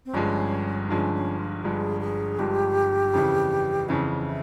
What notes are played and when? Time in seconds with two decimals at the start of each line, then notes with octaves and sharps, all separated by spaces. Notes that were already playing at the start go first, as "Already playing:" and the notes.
0.06 C4
0.13 G1 G2 F3 G#3 C#4
0.88 G1 G2 F3 G#3 C#4
1.14 C#4
1.38 F4
1.63 G1 G2 F3 G#3 G#4
2.00 G#4
2.38 G1 G2 F3 G#3 G4
3.13 F2 C#3 E3
3.89 F2 C#3 E3 C#4
4.21 F4
4.25 E4